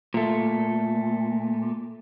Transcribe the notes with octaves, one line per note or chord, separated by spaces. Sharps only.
A#2 A3